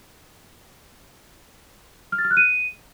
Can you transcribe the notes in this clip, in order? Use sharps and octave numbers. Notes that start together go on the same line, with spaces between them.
F6
A6
F6
F#6
D#7